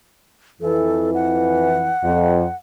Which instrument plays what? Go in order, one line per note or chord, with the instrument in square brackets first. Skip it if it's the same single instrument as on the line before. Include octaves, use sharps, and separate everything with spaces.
[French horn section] F2 E3 [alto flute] A4
[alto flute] F#5
[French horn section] F2